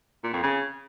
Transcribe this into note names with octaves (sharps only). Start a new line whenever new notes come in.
A#2
F2
C#3